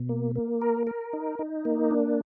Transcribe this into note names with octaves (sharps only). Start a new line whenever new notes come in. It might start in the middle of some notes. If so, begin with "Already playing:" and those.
Already playing: B2
A#3
A#3
A#4
A#4
D#4
D#4
A#3
D4